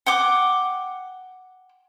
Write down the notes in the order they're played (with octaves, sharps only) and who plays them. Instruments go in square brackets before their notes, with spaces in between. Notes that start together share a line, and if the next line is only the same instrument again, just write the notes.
[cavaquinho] F#5 G5 D6